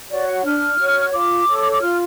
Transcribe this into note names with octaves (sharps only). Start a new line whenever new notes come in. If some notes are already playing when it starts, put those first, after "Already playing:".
F#4 C#5 D5
F#5
D4 F6
F#4 C#5
F4 D6
A4 C#5
D6
F4 F6